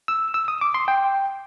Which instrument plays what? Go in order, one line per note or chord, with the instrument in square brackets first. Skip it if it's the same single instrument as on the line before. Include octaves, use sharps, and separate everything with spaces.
[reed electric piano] E6
E6
D#6
D6
C6
G5